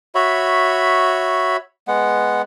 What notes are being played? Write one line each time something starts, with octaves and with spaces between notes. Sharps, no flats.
F#4 C#5 E5 B5
G#3 B3 F#5